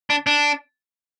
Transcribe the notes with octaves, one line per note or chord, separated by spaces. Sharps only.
D4
D4